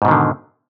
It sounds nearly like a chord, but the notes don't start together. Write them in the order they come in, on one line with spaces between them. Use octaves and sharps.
G#2 B2 D#3 D3